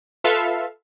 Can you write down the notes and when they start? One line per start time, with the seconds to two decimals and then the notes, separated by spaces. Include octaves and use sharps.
0.24 F4 A4 B4 E5 F5